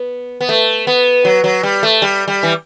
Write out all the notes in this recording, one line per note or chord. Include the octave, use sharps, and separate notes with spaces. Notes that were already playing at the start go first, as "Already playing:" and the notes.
Already playing: B3
B3
A3
B3
F#3
F#3
G3
A3
G3
G3
E3